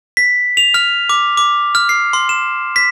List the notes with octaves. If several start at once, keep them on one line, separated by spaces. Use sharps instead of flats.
B6
F7
F6
D6
D6
F6
C7
C6
E7
B6